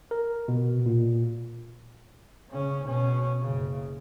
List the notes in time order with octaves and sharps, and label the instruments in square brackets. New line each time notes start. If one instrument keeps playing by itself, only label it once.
[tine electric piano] A#4
B2
A#2
[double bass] C#3 C#4
B2 C#4
F#1 C#3